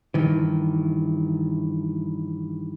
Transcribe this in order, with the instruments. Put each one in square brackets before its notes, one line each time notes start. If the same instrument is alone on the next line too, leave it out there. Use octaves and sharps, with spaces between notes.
[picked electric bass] G2 D#3 E3